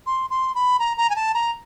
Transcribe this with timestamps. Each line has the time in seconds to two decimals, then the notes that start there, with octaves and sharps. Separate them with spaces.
0.06 C6
0.30 C6
0.55 B5
0.79 A#5
0.97 A#5
1.10 G#5
1.16 A5
1.34 A#5